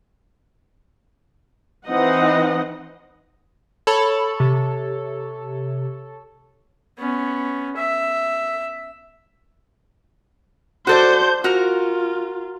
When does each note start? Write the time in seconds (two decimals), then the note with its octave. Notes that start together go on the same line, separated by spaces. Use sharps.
1.87 E3 C4 D#4 D#5 F#5
3.87 A4 C#5 B5
4.40 C3
6.98 B3 C#4
7.76 E5
10.87 F#4 A4 C5 D5 G6
11.44 F4 F#4 A#4